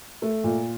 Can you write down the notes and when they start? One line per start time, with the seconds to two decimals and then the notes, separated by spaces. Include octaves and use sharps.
0.22 A3
0.44 A#2